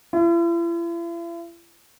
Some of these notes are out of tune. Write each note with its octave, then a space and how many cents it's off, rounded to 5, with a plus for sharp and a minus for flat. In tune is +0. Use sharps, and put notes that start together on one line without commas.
E4 +45